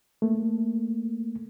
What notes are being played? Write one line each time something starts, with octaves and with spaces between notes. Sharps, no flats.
A3 A#3